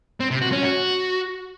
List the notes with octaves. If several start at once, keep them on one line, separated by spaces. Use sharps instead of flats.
C4
C3
F#4
C#4
F#4